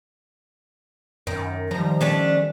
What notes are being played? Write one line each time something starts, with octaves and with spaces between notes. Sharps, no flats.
F#2 D#3
D#3 F3 G3 A#5
A3 C#4 D4